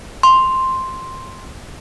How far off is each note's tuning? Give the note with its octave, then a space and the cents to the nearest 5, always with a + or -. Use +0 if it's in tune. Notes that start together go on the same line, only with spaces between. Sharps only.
C6 +5